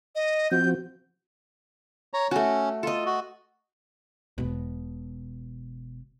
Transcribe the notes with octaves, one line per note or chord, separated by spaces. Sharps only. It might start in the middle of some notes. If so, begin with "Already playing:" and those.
D#5
F3 C4 F#4 G6
C#5 A#5
A3 C#4 F#4
F4 A4 D#5
F#4
E1 B2